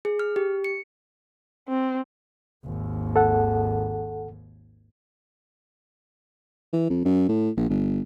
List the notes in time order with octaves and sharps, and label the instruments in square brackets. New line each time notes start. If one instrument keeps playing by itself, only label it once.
[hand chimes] G#4
F6
G4
C#7
[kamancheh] C4
[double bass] G#1 D#2
[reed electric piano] A4 F#5
[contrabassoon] E3
F2
F#2
A2
A#1
G1